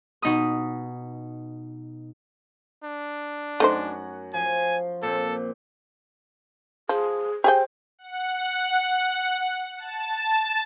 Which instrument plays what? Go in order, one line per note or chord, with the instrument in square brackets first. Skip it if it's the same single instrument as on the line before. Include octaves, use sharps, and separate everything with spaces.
[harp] B2 D#4 B5 D#6
[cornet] D4
[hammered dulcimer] F#2 F#4 F#5 [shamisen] A3 D#4 C5
[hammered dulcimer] F3 [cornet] G#5
[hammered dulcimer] A#2 C4 [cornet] A4
[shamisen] F3 [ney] G#4
[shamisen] G4 G#4 G5 [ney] C5
[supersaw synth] F#5
A5